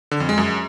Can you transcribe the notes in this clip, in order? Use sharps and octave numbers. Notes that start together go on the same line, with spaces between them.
D3
F2
G#3
F#2